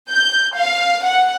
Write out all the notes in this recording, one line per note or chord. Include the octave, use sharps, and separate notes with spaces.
G6
F5
F#5